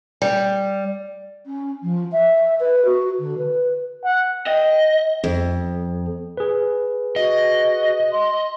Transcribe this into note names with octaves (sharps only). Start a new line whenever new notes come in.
G3
C#4
F3
E5
B4
F#4
D3
B4
F#5
D#5 G5
F2
G#4 B4
F#4 D#5
C6